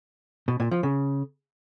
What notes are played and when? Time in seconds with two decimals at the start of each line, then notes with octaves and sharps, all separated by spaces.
0.48 B2
0.60 A#2
0.71 F3
0.83 C#3